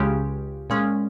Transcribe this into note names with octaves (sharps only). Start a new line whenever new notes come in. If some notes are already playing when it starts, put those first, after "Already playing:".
Already playing: C#2 C#3 G#3 C#4 G4
A#2 G#3 C#4